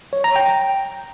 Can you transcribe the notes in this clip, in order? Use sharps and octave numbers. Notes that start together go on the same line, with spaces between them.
C#5
A#5
G5